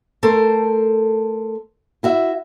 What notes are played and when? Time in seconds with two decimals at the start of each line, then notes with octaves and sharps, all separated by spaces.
0.23 A3 A4 A#4 C5
2.03 E4 F#4 E5